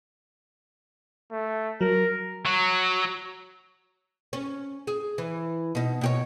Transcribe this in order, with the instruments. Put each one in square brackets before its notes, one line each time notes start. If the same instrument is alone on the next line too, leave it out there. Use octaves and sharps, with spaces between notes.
[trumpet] A3
[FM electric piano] F#3 [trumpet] A#4
[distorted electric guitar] F#3
[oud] C#4
G#4
E3
B2 D#4
B2 G4 C#5